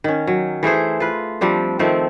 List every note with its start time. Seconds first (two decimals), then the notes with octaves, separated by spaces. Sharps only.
0.04 D#3 C#4
0.27 F#3
0.63 E3 A3 G#4 C5
1.00 F4 B4
1.41 F3 G3 C4 D4
1.79 D#3 F3 A3 C4